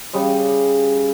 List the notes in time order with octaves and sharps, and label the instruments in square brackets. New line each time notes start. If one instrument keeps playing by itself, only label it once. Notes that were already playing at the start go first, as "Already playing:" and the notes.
[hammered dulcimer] C#3 G3 D#5